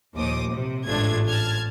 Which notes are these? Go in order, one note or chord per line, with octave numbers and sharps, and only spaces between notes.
A#1 D#2 C5 D6 D#6
C3
A1 G#2 A3 D4 F4 G#6
A5 F6 G#6